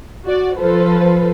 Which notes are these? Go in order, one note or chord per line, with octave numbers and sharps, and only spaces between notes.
F#4 D5
F3 F4 A4 B4 C5